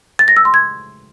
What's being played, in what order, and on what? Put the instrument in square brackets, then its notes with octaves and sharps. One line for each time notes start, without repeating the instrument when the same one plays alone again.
[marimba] A6
A#6
E6
C6
G#6